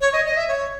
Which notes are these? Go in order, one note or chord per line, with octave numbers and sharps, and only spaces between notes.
C#5
D#5
D#5
E5
C#5